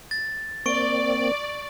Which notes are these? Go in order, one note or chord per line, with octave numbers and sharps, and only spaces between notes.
A6
A#3 C4 D5 C#6 D7